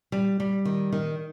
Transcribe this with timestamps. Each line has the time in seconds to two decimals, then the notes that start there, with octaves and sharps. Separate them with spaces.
0.12 G3
0.40 G3
0.65 D#3
0.92 D#3